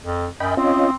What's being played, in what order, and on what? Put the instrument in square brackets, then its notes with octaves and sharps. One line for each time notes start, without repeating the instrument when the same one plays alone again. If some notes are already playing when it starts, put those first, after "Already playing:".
[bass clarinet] F2
[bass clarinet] F#2 [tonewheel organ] D#5 G5 B5
[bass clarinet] C4 [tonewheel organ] C#4 F4 D#5